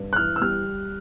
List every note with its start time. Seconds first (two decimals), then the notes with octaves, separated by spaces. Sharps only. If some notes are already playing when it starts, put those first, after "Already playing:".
Already playing: G2
0.13 F#6
0.16 E3 F6
0.36 E6
0.41 G3 F6